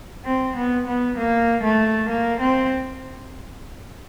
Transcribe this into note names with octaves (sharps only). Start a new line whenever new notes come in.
C4
B3
B3
A#3
A3
A#3
C4